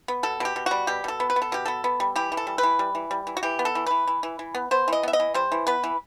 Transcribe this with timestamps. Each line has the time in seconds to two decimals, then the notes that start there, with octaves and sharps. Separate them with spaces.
0.08 B3
0.23 B2 A4
0.40 B2 G4
0.56 B2
0.66 G3 F#4
0.87 B2 G4
1.04 B2 A4
1.20 B3
1.30 B4
1.36 B3
1.42 A4
1.52 B2 G4
1.66 B3 A4
1.84 B3
2.00 G3
2.16 E3 G4
2.32 E3
2.37 A4
2.47 G3
2.58 B4
2.63 E3
2.79 G3
2.95 E3
3.11 G3
3.27 E3
3.37 F#4
3.43 E3 G4
3.59 B3
3.65 A4
3.75 E3
3.86 E3 B4
4.07 E3
4.23 E3
4.39 E3
4.55 B3
4.71 B3 C5
4.88 E3 D#5
5.03 B3 E5
5.13 D#5
5.20 E3
5.34 G3 C5
5.52 E3
5.67 B3 B4
5.84 E3